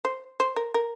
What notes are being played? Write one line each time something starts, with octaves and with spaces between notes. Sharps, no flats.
C5
C5
A#4
A#4